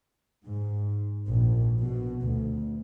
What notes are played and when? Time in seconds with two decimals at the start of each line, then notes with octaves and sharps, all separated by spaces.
0.47 G#2
1.28 A#1
1.84 B2
2.23 D2